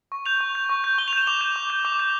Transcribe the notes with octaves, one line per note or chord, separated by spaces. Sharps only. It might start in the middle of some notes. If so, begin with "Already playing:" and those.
C#6
G6 F7
C#6
G6
C#6
G6
C#6 G7
F7
G6 E7
D6 F7
G6
D6
G6
D6 F7
G6